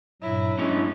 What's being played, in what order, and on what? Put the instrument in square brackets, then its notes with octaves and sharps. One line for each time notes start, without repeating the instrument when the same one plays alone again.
[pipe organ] G2 A#2 [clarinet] F#3 [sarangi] E4
[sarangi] G#3 [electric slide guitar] C#4 E4 [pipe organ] D4